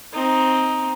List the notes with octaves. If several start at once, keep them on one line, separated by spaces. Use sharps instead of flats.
C4 D#4